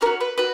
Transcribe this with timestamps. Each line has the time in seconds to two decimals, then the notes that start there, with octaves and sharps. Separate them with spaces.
0.01 C#4 A#4 C#5
0.06 F#4
0.21 B4
0.38 F#4 B4